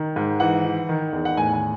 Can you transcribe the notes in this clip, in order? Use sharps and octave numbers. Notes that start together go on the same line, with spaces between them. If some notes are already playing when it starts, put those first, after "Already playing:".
Already playing: D#3
G#2
E3 F#5
E3
D#3
E2
F#5
A2 G#5
G#5